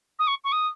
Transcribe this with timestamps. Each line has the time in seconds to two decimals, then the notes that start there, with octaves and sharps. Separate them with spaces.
0.19 D#6
0.27 C#6
0.44 C#6
0.52 D#6